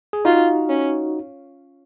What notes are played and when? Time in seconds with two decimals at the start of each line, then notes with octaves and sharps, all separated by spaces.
0.13 G#4
0.25 D#4 F4 F#4
0.69 C#4